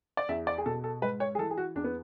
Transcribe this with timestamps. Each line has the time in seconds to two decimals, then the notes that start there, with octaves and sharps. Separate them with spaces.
0.17 D5
0.29 E2 E5
0.47 D5
0.58 G#4
0.66 B2 A4
0.84 A4
1.02 G#2 B4
1.20 C#5
1.35 G#4
1.39 E3 A4
1.51 G#4
1.58 F#4
1.75 E2 D4
1.84 B3